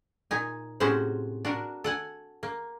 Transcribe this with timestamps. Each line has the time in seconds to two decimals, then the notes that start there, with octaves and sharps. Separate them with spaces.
0.31 A#2 D#4 G#5
0.80 A2 C3 G#3 C#4 F#4 C5
1.45 D4 F#4 A#4
1.84 A4 F#5 G#5
2.43 A#3